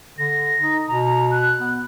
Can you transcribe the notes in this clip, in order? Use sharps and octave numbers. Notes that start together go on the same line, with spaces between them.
D3 A#6
D#4
B2 A#5
F#6
B3